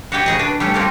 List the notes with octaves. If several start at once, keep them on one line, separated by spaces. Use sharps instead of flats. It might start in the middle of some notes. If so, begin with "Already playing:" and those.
F#4 G4 D5 G5 G#5
C#3 G#4 D#5
D4 B4
G3 A3 C#4
G3 A3 A#3 C4 D#4